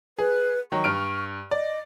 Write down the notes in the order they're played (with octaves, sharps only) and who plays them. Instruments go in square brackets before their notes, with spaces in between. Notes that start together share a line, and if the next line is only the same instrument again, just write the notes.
[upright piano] G#4 [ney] B4
[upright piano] D#3 F#3 [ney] C#6
[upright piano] G2 F6 D7
[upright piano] D5 [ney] D#5